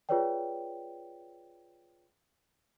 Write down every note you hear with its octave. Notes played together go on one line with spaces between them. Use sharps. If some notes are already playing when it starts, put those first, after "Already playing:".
F4 G#4 B4 C#5 D5 G5